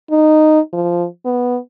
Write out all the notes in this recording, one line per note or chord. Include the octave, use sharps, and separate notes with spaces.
D#4
F3
B3